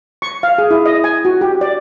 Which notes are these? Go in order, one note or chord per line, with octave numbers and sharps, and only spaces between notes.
C#6
F5
G#4
E4
D#5
G#5
F#4
G4
D5